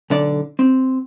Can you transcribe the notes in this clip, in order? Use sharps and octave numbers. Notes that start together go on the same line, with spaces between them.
B1 D3 D5
C4